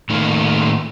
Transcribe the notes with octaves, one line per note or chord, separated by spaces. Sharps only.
A2 D#3 A3 A#3